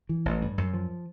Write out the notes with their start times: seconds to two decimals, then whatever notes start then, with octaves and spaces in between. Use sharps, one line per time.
0.09 E3
0.25 A1
0.42 G2
0.58 F#2
0.73 F3